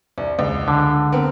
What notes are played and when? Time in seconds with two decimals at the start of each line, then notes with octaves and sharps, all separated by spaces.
0.18 C2
0.39 C#2
0.68 D3
1.12 B3 C4 A#4